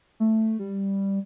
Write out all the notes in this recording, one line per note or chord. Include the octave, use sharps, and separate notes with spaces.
A3
G3